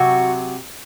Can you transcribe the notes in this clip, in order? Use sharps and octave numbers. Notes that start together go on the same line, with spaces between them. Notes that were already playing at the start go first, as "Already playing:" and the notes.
Already playing: C3 F#3 F#4